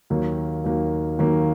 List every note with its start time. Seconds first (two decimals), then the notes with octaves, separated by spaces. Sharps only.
0.10 D#2 D#3 F#3 A#3
0.64 D#2 D#3 F#3 A#3
1.19 D#2 D#3 F#3 A#3